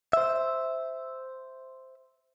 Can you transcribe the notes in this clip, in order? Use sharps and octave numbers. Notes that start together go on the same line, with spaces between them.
C5 E5